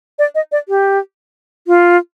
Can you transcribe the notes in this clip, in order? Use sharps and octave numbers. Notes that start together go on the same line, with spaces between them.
D5
D#5
D5
G4
F4